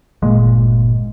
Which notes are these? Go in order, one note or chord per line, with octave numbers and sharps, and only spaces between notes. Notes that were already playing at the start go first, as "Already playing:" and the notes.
G1 A#2 G#3 A#3